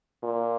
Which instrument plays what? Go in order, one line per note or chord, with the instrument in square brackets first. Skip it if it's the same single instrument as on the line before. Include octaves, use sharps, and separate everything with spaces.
[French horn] A#2